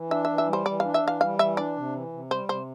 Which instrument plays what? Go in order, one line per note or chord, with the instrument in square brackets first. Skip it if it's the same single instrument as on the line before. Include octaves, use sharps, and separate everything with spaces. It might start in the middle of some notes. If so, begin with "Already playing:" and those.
Already playing: [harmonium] E3
[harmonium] D4 [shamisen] E5
[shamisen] E5
[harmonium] E3
[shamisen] E5
[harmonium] G3
[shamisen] C5
[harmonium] E3 [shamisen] D5
[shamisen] F5
[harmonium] D4
[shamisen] E5
[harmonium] E3 [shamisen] F5
[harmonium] G3 [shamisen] F5
[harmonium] E3 [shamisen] E5
[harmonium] D4 [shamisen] D5
[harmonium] C3
E3
C3
[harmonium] G3 [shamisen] C5
[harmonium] C3 [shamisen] C5